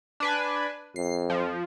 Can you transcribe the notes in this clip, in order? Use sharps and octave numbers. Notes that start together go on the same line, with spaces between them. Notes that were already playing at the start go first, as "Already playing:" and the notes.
D4 B4 G#5
F2 C7
F3